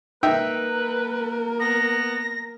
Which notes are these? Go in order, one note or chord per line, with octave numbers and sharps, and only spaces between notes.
A#3 D#4 A#4 B4 E5 G5
B3 A#6